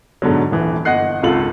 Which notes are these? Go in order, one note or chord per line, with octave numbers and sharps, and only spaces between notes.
G#2 B2 D3 F#3
D#1 E3
G1 D#5 F#5 F#6 C7
G#1 C#2 F4 A4 F#7